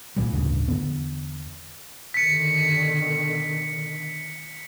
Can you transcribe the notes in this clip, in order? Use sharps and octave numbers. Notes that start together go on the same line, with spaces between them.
B1 A#2 E3 G3
A1 D2 G2 C#3
E2 D3 B3
B2 D3 D#3 B6 C#7